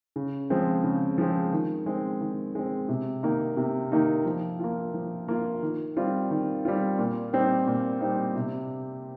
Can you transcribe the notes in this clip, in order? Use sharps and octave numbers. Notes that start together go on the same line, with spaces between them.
C#3
F3 G#3 C4
C#3
F3 G#3 C4
D#3
G#3 C4
D#3
G#3 C4
C3
D#3 A#3 D#4
C3
D#3 A#3 D#4
F3
A#3 F4
F3
A#3 F4
D#3
G3 C4 F4
D#3
G3 C4 F4
A#2
G3 C4 D#4
A#2
G3 C4 D#4
C3